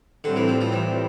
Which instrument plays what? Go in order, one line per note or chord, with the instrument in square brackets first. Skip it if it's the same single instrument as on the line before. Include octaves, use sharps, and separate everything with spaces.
[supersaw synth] A2 G3 C4 [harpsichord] D3
[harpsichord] E3
F3
F3
E3